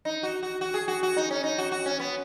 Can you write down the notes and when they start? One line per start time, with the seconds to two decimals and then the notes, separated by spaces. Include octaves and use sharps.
0.05 D#4
0.23 F#4
0.43 F#4
0.61 F#4
0.74 G#4
0.88 F#4
1.03 F#4
1.17 D#4
1.31 C#4
1.44 D#4
1.58 F#4
1.72 F#4
1.86 C#4
2.00 B3